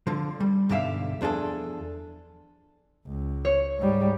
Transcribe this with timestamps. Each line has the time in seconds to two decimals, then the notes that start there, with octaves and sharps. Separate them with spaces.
0.07 D3 F3
0.40 G3
0.69 B1 G2 D3 G4 E5 F5
1.21 E2 F3 D4 G#4 A4
3.07 C#2
3.45 C#5
3.79 G#2 G3